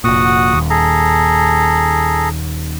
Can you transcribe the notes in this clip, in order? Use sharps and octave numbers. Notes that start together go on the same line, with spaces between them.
F1 A#2 F#4 F#5 D#6
D#1 D#2
G#4 A4 A#5